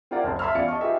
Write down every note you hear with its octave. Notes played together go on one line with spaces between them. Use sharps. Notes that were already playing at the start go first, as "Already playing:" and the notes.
C4 E4 F4 A#4 D5 F#5
F#1 C#2 C5 A5
E5 A5 B5 C6 E6 F6
E2 C#4 F4 D5 F5 C#7
D#5 A5 C#6 F6
D#4 F4 G4 G#4 B4 E5